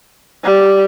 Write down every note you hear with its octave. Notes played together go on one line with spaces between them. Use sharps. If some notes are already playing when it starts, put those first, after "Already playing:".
G3